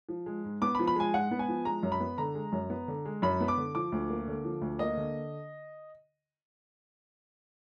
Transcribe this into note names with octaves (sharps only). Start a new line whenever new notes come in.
F3
G#3
G#2
B3 D6
B5
F3
B5
G#3 G#5
G#2 F#5
B3
G#5
F3
G#3 A#5
F#2
B5
B3
D3 A#5
G#3
F#2
B3
D3
G#3
F#2 B5
B3
D6
D3
F3 D6
D2
A#3
D3
F3
D2
A#3 D#5
D3